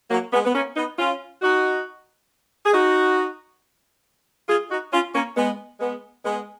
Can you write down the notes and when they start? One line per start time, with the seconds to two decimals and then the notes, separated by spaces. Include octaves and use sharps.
0.11 F#3 A#3
0.33 G#3 B3
0.45 B3
0.54 A#3 C#4
0.76 B3 D#4
0.98 C#4 F4
1.42 D#4 F#4
2.66 G#4
2.73 D#4 F#4
4.49 F4 G#4
4.70 D#4 F#4
4.92 C#4 F4
5.14 A#3 C#4
5.37 G#3 B3
5.80 G#3 B3
6.25 G#3 B3